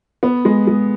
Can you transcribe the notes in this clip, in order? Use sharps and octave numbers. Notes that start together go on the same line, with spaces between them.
B3
G#3
G#3